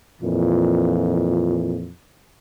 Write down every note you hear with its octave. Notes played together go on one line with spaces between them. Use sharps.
F2 A#2 E3